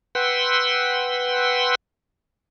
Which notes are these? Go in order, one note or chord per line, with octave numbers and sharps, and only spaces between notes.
B4 F#5 G5 C6 E6